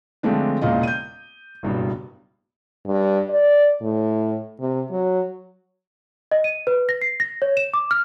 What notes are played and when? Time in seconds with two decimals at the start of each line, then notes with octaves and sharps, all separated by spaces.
0.23 D3 F3 G#3 A3 C4 D4
0.61 E1 A#2 C#3 F4 D#5
0.83 G6 D#7
1.63 F#1 G2 B2
2.87 G2
3.29 D5
3.82 A2
4.60 C3
4.91 F#3
6.32 D#5
6.44 D#7
6.67 B4
6.89 A#6
7.02 C7
7.20 A#6
7.42 C#5
7.57 E7
7.74 D6
7.91 F6